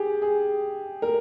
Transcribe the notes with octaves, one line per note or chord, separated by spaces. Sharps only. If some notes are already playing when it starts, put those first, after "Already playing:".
Already playing: G4 G#4
G#4
A#4